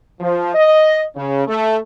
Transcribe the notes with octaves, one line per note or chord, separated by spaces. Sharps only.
F3
D#5
C#3
A3